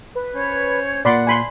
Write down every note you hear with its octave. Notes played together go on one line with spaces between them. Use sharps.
B4
C#4 C5 C#5
A#2 D5 F#5 B5 C6
G#5 B5 C6